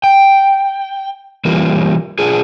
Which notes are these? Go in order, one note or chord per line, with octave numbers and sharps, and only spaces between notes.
G5
E3 G3 A#3 C#4 F4
D4 F4 G#4